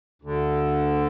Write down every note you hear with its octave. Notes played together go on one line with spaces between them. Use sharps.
D2 D3